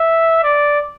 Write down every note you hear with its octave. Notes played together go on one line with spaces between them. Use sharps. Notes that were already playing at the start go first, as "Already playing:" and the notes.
Already playing: E5
D5